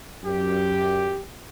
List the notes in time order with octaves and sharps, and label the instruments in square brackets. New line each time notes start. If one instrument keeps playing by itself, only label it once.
[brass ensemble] F#2 G4